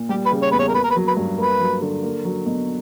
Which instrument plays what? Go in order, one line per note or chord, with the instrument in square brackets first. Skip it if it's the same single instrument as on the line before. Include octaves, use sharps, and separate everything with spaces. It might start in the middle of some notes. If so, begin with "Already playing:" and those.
Already playing: [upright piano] A#2
[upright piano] G3 [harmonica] G4
[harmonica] B4
[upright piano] C#3
[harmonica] C#5
[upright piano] E2 [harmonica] B4
[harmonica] C#5
A#4
[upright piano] A#3 [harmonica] B4
[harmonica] A#4
B4
[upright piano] F#3
[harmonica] B4
[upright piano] G2
[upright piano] A#3 [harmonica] B4
[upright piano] F#3
D3
A#3
F#3
B2